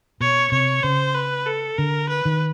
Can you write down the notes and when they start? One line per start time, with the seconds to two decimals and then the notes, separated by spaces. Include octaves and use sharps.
0.20 B2 C#5
0.52 C3 C#5
0.83 C#3 C5
1.15 B4
1.46 A4
1.78 D3 A#4
2.10 B4
2.25 D#3